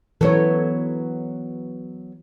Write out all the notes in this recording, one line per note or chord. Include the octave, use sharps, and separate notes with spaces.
E3 F#3 B3 A4 C#5